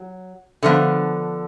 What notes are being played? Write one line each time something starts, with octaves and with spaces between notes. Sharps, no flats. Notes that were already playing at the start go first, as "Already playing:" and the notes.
Already playing: F#3
D3 F3 B3